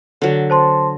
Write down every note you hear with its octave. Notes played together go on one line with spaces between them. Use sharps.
D3 F#3
C5 A5 C6